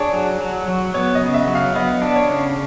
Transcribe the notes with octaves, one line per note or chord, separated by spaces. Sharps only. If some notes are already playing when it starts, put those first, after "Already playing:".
Already playing: D4 G#4 C#5
F#3
F#3
F#3
B3 C#5
D#5
C#3
E5
F#3
F5
B3 D#5
D4
C#5
C#3